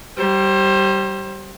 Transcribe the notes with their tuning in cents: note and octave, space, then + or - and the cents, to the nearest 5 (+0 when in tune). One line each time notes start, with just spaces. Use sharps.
G3 -20 C5 +30